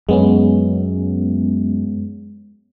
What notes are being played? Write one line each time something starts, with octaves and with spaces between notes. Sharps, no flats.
F#2 G#3 B3 C#4